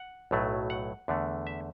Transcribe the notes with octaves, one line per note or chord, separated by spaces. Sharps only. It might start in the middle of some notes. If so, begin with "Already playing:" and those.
Already playing: F#5
B1 A2 F#3 A3
F#5
E2 D3 A3
E5